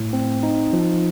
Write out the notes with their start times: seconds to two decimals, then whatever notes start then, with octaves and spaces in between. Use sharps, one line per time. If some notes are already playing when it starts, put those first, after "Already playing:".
Already playing: A2
0.13 C4
0.43 D#4
0.73 F3